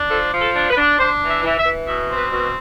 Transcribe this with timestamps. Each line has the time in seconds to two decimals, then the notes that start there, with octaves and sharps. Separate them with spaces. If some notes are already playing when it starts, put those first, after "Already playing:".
Already playing: D4
0.10 F3 A4
0.32 F3
0.41 A4
0.56 D4
0.70 B4
0.77 D4
0.99 D4 C5
1.22 E3
1.29 E5
1.44 E3
1.59 E5
1.65 E3
1.88 B2 E5
2.09 C4
2.17 B4
2.32 B2